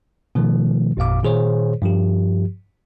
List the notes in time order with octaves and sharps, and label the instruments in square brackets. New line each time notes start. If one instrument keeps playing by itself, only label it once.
[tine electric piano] B2 D#3 F3 A3
G#1 F2 A#2 F5 D6
A#2 D#3 G#4 C5 C#5
G2 F3 G4